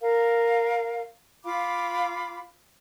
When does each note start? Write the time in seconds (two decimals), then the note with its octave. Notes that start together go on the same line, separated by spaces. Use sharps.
0.01 A#4 F5
1.43 F4 F5 B5 D6